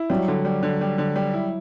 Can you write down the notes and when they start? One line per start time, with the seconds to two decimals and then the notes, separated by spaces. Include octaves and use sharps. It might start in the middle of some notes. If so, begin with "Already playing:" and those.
Already playing: E4
0.10 F#3 G3
0.28 D3
0.45 G3
0.63 D3
0.81 G3
0.98 D3
1.16 G3
1.33 E4